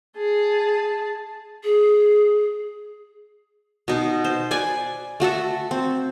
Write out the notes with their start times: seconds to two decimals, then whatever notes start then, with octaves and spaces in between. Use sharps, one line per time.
0.17 G#4 A5
1.64 G#4
3.88 B2 D#4
4.24 C5
4.51 B4 D5 G#5
5.20 A3 F#4 A4 E5
5.71 C4